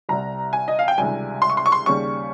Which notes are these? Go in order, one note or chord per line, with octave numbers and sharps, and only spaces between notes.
C2 C3 G3 A#5
G#5
D#5
F5
G5
C#2 C3 D#3 G3 G#5
C6
C#6
C6
C#6
C6
D#2 C#3 G3 C#6